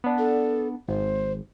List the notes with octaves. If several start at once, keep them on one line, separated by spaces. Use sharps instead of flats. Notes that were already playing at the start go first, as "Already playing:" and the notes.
B3 D4
A4
G#1 C5